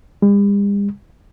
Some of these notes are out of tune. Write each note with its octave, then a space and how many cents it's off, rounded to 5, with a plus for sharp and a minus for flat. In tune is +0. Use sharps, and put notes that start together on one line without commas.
G3 +45